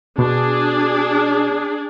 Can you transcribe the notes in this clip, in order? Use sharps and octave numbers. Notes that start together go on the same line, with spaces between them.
B2 D4 G#4